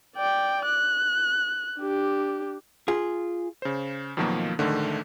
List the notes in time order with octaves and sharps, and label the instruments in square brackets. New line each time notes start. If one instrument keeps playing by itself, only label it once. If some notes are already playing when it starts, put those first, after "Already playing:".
[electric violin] D5 G5
F#6
D4 G4
[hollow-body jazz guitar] F4 G#4
[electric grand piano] C#3 C5
F2 B2 D#3 F3 F#3 A#3
A#1 G#2 D3 D#3 A3